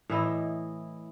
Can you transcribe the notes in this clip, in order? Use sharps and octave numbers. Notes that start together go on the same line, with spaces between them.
A2 E3 E4 D#5